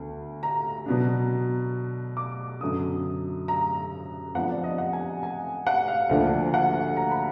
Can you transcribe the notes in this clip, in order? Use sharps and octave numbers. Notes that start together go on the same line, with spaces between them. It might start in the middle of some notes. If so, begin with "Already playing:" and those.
Already playing: D2 D3 B3
A#5
B2 F#3 B3 D4
D6
F#2 D3 F#3 B3 D#6
A#5
F2 F3 B3 D4 F#5
D5
D#5
F#5
G#5
G#5
F#5
F5
D2 D3 F3 A#3 D4
F#5
A#5
B5